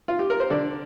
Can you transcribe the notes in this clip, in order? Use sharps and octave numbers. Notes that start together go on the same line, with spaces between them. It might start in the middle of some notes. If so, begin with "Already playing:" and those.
F4
G4
A#4
C5
D3 D5